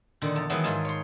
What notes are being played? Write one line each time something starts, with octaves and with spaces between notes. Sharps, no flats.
A#2 D3 D#3
E2 A5
D#3 E3 F#3 G#3 B3
G#2 D#3 F4 A#4 G#5 A5
C#5 C6